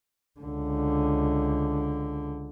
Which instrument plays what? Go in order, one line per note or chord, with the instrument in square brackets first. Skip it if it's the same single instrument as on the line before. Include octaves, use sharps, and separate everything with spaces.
[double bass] C#2 D3